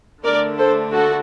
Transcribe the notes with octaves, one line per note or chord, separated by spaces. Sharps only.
D3 A3 D4 A#4 D5
A4 C5
F#4 A4